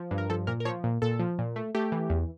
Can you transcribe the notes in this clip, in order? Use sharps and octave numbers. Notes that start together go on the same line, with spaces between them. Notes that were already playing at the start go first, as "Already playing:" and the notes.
Already playing: F3
G2
A#4
F3 A4
A#2 A#4
A#4
F3 C#5
A#2
A#2 A4
F3
A#2
A3
A3 G4
E3
E2